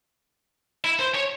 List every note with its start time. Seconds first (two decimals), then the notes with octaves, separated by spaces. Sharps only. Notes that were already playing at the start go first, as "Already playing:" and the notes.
0.84 E4
0.99 C5
1.15 C#5